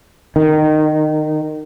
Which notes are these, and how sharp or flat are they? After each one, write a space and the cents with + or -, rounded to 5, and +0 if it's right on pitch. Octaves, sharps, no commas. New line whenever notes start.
D#3 -20